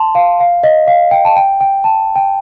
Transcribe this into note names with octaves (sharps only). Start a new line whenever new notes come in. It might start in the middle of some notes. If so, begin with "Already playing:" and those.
Already playing: A5 C6
F5
F5
D#5
F5
G5
A5
G5
G5
A5
G5